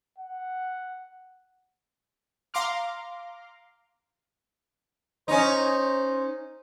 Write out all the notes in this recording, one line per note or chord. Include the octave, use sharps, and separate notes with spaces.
F#5
F5 A#5 C6 D6 F6
C#4 D#4 C5